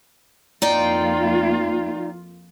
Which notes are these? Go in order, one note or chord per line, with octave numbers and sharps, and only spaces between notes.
F2 A#3 D#4 F4 D5 G5